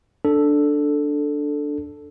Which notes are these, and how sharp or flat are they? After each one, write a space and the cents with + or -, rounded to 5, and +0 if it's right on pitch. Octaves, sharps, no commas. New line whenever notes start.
D4 +0 A4 +0